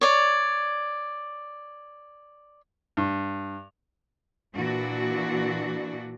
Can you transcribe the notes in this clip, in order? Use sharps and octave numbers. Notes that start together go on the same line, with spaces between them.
C#5 D5
G2
A#2 E3 D4 F#4